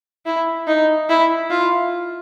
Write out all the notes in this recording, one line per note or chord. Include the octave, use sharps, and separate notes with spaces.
E4
D#4
E4
F4